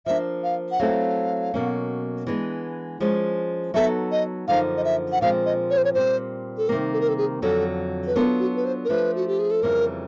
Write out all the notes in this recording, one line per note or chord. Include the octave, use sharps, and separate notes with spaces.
F3 A#3 D4 E5
F5
F#5
F#3 A3 C4 E4 A4 F5
B2 F#3 A#3 C#4
E3 G#3 B3 D4
F3 G#3 C#4
F#3 B3 D#4 F#4 A4 E5
D#5
F#2 D3 F3 A#3 D#4 F5
D#5
E5
F#5
A#2 F3 G#3 C4 F5
D#5
C#5
C5
C#5
A#2 G3 C4 C5
A4
C3 D#3 G3 A#3 A#4
A4
A#4
A4
G#4
F2 D3 F#3 A4
B4
F#3 B3 D4 F4 A4 A#4
F#4
B4
C5
A#4
F3 A3 D4 F4 B4
F#4
G4
G#4
A4
F2 C#3 E3 G3 A#3 A#4